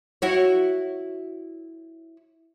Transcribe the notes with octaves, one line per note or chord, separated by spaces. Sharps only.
E4 F#4 C#5